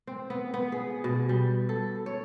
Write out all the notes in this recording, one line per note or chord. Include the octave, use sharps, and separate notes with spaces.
C4
B3
B3
G#4
B2
G3
A4
C#5